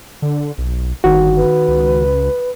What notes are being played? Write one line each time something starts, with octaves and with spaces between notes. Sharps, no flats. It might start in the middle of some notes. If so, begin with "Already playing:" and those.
D3
B1
G1 D#3 F#4
B4
C#2